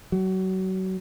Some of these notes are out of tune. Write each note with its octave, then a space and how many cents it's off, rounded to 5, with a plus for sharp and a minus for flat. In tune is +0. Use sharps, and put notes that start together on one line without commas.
F#3 +30